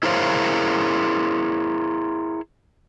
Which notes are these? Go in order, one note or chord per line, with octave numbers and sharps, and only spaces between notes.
E4 G#4 A#4 C5 C#5 F5